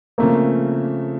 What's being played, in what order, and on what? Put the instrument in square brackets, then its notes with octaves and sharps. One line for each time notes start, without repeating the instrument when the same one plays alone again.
[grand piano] C#3 F3 A3 C4 [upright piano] A#3